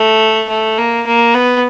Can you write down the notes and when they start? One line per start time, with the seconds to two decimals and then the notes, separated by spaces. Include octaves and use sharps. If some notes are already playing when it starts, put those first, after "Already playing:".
Already playing: A3
0.49 A3
0.78 A#3
1.07 A#3
1.34 B3